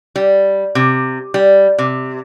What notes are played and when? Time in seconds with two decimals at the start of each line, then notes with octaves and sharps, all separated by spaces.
0.16 G3
0.75 C3
1.34 G3
1.79 C3